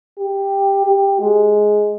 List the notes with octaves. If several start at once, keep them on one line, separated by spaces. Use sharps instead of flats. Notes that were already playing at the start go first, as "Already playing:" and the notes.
G4
G4
G#3